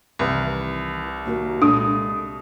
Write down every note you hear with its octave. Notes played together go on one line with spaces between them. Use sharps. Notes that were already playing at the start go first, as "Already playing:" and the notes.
C2 D#3 E3 B4
D#2 F#4 A#4
A#2 G#3 D4 A4 D#6